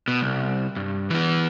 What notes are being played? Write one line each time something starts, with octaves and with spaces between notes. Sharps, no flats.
B2
C2
G2
E3 B3